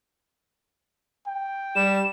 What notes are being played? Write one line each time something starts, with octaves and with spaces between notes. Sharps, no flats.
G5
G3 E7